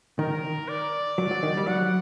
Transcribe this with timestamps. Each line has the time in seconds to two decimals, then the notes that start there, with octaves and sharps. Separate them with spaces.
0.19 D#3 A#4
0.69 D5
1.18 F#3
1.31 F#3
1.43 D#3
1.57 G3
1.67 F#3 F#5